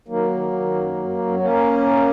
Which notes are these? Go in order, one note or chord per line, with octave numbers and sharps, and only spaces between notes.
D#3 F#3 A#3
D#3
D#3
F#2
F#2
F#2
A#3 C#4